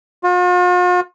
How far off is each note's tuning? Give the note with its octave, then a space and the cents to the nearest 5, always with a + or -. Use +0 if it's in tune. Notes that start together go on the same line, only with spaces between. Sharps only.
F4 +45